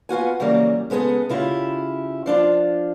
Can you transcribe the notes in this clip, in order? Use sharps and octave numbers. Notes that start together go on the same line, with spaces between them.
B3 F4 F#4 G#5
C#3 E3 F#3 G3 A#3
C#3 G#3 B3 G#4 A4
C#3 E4 F4 G4
F3 D4 F4